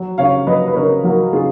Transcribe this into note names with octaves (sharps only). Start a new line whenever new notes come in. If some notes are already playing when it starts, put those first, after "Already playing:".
Already playing: F#3
C#3 C#5 F5
F#3 B4 D#5
B4
C#3 A#4 C#5
F#3 F#4 A#4
C#3 F4 G#4